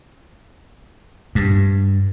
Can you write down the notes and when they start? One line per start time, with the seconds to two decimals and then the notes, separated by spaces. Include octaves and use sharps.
1.35 G2